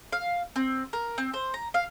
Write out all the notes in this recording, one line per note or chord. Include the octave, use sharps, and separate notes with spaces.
F5
C4
A#4
C4
C5
A#5
F5